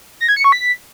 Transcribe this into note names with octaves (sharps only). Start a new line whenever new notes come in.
A#6
G#6
C#7
C#6
B6